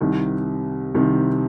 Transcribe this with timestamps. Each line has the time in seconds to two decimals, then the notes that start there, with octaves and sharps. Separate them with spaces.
0.01 C2 C3 D#3
0.94 C2 C3 D#3